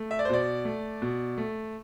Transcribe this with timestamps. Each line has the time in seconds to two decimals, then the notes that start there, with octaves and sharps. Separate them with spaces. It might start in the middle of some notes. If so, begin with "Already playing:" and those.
Already playing: A3
0.11 E5
0.19 D5
0.25 C5
0.29 B2 D5
0.65 A3
1.02 B2
1.38 A3